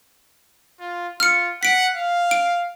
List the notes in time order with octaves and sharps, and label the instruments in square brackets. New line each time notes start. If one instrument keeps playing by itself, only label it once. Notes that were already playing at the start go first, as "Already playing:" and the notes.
[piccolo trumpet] F4
[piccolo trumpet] F4 [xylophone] F6 C#7
[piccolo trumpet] F#5 [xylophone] B6 D7
[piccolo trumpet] F5
[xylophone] D7